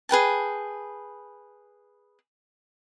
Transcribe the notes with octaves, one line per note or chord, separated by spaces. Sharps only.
G#4 B4 G5 A5